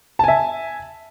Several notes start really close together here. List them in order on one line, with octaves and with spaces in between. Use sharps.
A5 G#5 E5